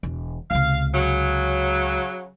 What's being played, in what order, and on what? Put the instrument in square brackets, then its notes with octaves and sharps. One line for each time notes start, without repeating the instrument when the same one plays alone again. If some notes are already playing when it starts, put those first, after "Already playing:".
[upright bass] E1
[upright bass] C#2 C3 [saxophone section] F5
[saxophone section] C#3 F#3